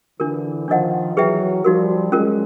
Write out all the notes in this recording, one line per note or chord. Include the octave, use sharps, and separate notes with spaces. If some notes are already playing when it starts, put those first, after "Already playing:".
D3 E3 D4 F4 A#4
D#3 F3 D4 F4 A#4 D#5 F#5
E3 F#3 G#4 B4 E5 G5
F3 G3 D#4 F#4 A#4
F#3 G#3 C#4 F4 A#4